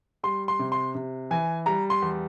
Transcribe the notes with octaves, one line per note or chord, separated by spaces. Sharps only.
G3 C6
C6
C3
C6
C3
E3 G#5
G3 A#5
C6
E2